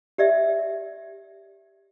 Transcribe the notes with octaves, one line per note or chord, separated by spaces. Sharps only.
G4 D5 E5